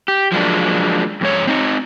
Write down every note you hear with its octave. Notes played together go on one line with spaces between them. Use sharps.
G4
F3 F#3 G#3 A#3 D4
F2 G#2 C#5
C4 D#4